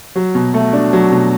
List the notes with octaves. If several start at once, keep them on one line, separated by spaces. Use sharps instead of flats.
F#3
B2
A3
D4
F#3
B2